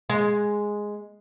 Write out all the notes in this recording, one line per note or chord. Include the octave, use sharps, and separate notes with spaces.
G#3